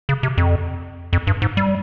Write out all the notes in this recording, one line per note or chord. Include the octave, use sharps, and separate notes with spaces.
C#3
C3
F2
F2
G2
G#2
G3